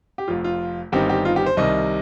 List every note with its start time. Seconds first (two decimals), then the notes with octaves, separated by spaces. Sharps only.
0.18 G4
0.28 F1 F2 F3 F4
0.44 F4
0.92 G1 G2 D#3 C4 D#4 G4
1.09 G4
1.25 F4
1.36 G4
1.46 C5
1.57 C2 C3 D#3 D#5